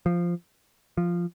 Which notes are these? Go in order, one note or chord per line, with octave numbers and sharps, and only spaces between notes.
F3
F3